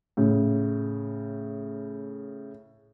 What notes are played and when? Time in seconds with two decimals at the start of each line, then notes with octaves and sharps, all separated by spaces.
0.17 A2 C#3